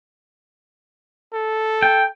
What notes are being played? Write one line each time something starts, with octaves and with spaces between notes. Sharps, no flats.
A4
G5